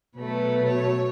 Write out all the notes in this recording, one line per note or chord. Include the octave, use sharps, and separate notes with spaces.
B2 F#3 A3 B4
C#5